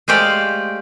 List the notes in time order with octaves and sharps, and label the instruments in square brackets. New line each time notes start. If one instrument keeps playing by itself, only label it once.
[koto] G#3 A3 G4 C5 D5 F5